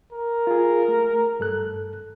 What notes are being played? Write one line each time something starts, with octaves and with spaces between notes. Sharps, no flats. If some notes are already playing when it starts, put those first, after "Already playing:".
A#4
F4 G#4
A3
G2 A4 F#6